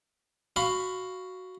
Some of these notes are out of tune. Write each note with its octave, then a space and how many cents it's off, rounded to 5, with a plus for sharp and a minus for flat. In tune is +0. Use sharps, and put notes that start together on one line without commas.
F#4 +0 F5 +0 B5 +25